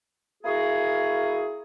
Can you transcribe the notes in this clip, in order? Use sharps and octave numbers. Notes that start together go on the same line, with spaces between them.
A#3 E4 F#4 G#4